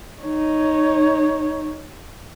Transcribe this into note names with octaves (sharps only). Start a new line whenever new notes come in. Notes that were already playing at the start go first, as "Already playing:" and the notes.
D#4 C#5